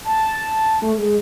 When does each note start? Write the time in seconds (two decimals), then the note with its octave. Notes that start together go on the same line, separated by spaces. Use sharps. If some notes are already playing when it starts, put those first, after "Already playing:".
0.04 A5
0.82 A3
0.97 G#3